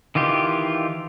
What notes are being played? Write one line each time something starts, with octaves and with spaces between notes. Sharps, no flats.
D#3 E3 F4 G4